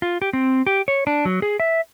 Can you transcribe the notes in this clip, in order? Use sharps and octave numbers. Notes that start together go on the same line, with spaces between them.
F4
G4
C4
G4
C#5
D4
F#3
G#4
E5